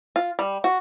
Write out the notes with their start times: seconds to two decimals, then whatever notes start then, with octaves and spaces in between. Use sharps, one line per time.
0.16 F4
0.39 G3
0.64 F#4